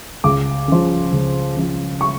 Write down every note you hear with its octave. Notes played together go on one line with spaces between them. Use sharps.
C#2 D6
C#3 F3
C#2
C#3 F3
C#6